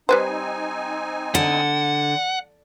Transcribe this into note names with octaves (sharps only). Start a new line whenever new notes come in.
G3 C4 D#4 B4 C5 G#5
D3 F#5